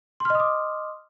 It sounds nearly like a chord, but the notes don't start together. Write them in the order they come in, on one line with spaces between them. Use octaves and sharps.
C6 F6 D#5 D#6 D6